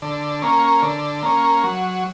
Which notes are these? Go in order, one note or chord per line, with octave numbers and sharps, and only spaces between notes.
D3
A#3 C#4
D3
A#3 C#4
F#3